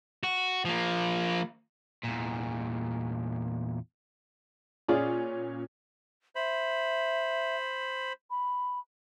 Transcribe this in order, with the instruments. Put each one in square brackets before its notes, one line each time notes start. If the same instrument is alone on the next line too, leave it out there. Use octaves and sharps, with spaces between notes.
[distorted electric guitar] F#4
F3 A#3
[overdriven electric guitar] E2 A#2
[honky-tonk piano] A#2 C#4 [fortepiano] F4 G#4 D5
[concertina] C5 B5 [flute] E5
[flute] B5